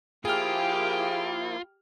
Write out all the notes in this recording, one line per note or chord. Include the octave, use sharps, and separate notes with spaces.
F3 A#3 E4 F4 G4 G#4 G5 F6